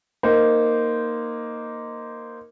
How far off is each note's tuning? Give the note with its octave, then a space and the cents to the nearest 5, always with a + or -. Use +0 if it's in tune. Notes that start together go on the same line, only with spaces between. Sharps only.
A#3 +0 D#4 +0 C5 -10